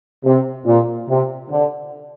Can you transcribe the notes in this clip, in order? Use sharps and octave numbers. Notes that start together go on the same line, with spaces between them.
C3
A#2
C3
D3